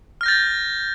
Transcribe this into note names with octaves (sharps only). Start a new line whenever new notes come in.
F6 G6 A6 A#6